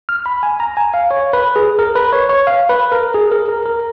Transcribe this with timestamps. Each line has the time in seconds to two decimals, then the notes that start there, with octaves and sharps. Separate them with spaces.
0.09 F6
0.26 B5
0.43 G#5
0.60 A#5
0.77 G#5
0.94 F5
1.11 C#5
1.33 B4
1.56 G#4
1.79 A#4
1.95 B4
2.13 C#5
2.29 C#5
2.47 F5
2.69 B4
2.92 A#4
3.14 G#4
3.32 A#4
3.49 A#4
3.65 A#4